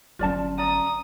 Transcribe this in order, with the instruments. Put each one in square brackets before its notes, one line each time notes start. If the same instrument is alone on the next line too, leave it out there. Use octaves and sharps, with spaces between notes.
[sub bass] G1 [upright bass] F#3 C#4 [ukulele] F4 D5 A5
[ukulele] D5 A#5 [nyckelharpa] D#6